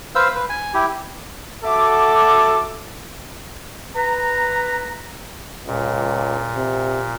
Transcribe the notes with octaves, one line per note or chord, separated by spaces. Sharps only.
B4 C5 F5 E6
B4
G#5
E4 G4
F#4 A4 E5 D6
B4 A#5
C#2 A#2
C3